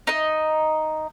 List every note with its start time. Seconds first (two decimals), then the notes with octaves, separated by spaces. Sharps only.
0.07 D#4 D#5